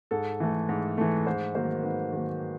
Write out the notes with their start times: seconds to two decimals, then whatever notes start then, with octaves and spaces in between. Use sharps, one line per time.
0.11 G#2 A4
0.40 E3 A3
0.69 G#2
0.98 E3 A3
1.26 G#2 C5
1.55 D#3 F#3 A#3 C5
1.83 G#2 B4
2.13 D#3 F#3 A#3